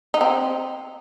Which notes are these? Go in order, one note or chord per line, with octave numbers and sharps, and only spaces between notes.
D#4
C4